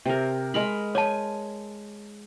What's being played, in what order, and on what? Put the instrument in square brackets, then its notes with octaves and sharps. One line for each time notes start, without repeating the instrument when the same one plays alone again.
[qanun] C3 A#4
G#3 A#4 B5
[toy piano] C#5 A5 [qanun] G#5